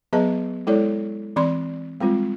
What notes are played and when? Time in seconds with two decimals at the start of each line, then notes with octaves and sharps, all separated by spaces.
0.13 F#3 B3 G#4 B4 D#5 A5
0.67 G#3 E4 A4 C#5 D5
1.36 E3 C4 D5 B5 C6
2.00 G3 G#3 C4 F4